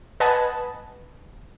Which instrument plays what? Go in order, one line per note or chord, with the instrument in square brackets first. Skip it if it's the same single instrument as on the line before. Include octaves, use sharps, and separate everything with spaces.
[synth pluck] B4 D#5 F#5 G#5 A5 B5